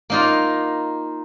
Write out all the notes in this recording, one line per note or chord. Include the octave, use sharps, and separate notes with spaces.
A#3 D#4 F4